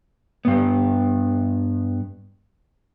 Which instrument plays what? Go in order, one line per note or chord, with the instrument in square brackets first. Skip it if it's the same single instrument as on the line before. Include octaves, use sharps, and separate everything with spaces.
[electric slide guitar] G2 B3